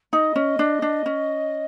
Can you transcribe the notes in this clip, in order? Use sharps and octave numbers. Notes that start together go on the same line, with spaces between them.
D#4 D#5
C#4
D4
D4
C#4